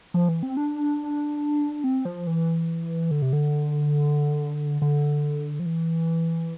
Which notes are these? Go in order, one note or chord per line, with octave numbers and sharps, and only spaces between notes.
F3
E3
C4
D4
C4
F3
E3
D3
C3
D3
D3
F3
E3